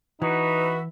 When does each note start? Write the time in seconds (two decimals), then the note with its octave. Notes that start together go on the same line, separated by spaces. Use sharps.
0.22 E3 D#4 F#4 B4 E5 B5